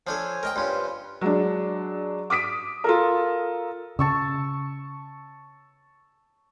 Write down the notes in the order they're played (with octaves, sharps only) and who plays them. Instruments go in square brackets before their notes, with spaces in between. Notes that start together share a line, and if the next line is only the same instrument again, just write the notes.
[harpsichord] F3 D4 A4 [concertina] C5 C#5 G#5
[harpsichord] A#4 D#5 G5
[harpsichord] G2 C#4 [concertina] F4 B4 C5
[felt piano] F#3 G#3 D4
D6 D#6 B6 D7
F4 A4 A#4
[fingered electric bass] C#3 [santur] A5 C#6 E6